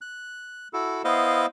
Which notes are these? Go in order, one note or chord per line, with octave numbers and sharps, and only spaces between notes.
F#6
E4 F#4 A4
B3 E4 C5 D#5 F5